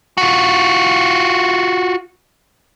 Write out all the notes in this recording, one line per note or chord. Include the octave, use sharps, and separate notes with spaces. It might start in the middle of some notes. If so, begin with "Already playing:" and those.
F4 F#4